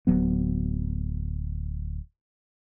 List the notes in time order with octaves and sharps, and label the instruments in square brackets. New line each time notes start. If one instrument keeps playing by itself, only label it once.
[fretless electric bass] D1 F#3 B3